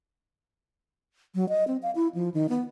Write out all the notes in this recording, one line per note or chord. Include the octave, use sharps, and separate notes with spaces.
F#3
D#5
C4
F5
E4
F3
D#3
B3